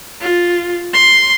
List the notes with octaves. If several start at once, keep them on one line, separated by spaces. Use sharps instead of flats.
F4
C6